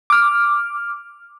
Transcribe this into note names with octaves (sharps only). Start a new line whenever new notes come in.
D6 F6